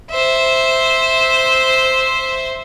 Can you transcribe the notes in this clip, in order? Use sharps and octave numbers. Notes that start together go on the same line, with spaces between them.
C5 E5